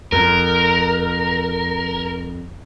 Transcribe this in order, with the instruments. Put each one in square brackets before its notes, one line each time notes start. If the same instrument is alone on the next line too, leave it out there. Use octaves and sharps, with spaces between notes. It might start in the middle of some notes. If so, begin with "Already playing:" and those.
[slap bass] F2 [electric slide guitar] A#4